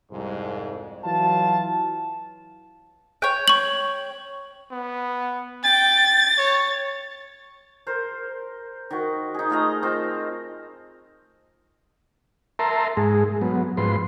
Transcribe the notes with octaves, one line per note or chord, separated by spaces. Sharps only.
C2 F2 G#2
E3 F#3 F4 A5
C#5 G5
C#6 F#7
B3
G5 A6
C#5
A#4 C5
D#3 F#4
D#4 G#4
A3 F4 D#5 A#5
C4 F4
A#4 E5 A5 A#5 C6
G#2 G#3 G#4
F#3 B3
G#2 F3 B4 C6